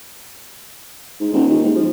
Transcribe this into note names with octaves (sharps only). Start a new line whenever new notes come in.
G#2
D#1
D#2
G#2
F3